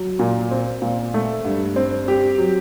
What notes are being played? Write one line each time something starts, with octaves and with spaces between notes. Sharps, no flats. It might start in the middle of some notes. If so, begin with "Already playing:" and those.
Already playing: F#3
A#2
C4
A#2
A3
G2
C4
G4
F#3